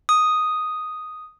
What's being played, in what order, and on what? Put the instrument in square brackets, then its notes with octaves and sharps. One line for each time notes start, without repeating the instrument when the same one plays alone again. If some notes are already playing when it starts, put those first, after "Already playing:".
[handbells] D#6